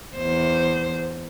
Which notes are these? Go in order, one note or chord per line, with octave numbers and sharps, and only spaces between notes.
E2 C5